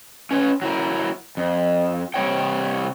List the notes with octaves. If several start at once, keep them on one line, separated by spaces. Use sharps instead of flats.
C#4 B4 C#5
F#3 E4 A#4
F2
C3 G3 C4 C#5 G5